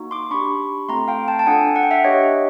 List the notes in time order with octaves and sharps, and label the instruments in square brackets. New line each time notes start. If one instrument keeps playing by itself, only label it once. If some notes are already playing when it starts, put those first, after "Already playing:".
Already playing: [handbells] A#3 D#4 F#4
C6 D6
D4 G4 B5 C#6
A3 C4 F4 A4 A#5 C6
F5 G5
G5 A5
A5
D4 F4 A4 F#5 G#5
F#5
G5
E5 F#5
D4 G4 C#5 D#5